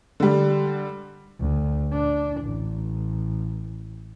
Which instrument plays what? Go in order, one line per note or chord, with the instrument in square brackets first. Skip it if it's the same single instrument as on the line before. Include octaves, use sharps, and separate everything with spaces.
[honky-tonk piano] D3 G3
[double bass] D2
D4
A1